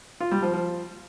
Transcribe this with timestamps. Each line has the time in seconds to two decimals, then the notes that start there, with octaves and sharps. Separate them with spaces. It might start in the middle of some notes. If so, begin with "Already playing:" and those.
0.20 F4
0.31 G3
0.42 F3
0.53 F3